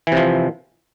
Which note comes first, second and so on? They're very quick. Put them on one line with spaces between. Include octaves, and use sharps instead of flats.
E3 C3 F3